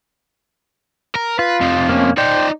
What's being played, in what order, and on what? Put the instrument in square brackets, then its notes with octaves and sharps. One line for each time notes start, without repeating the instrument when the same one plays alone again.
[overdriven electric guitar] A#4
[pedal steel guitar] F4 [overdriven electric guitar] B4
[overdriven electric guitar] F2 C3
[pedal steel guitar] A#3 C#4
[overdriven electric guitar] D#4 D5 [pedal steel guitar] C5 G5